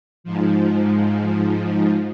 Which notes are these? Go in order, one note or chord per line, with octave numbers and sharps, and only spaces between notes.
G#2 F3